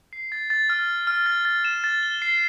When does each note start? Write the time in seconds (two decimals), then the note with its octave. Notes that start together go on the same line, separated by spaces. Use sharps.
0.13 C7
0.32 A6
0.50 A6
0.70 F6
0.89 F6
1.07 F6
1.26 A6
1.45 A6
1.65 E7
1.84 A6
2.03 G7
2.22 C7